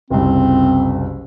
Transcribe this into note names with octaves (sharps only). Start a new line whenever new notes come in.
F#1 C2 C4